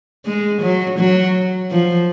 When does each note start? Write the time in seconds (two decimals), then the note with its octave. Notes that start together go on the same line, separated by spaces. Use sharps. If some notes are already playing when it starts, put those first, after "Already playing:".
0.25 G#3
0.62 F#3
0.99 F#3
1.71 F3